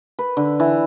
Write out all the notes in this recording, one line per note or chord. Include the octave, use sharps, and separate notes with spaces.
B4
D3
E3